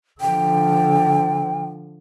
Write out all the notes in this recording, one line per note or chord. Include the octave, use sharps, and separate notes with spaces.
D3 F3 G5